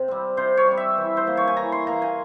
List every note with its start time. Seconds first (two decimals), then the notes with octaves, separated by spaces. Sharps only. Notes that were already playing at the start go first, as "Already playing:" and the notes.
Already playing: C3
0.08 G3 C4
0.37 C3 C5
0.57 C#5
0.67 G3 C4
0.77 E5
0.97 E3
1.17 C5
1.27 A#3
1.37 C#5
1.48 G#5
1.57 E3 A#5
1.72 C6
1.87 A#3 A#5
2.02 G#5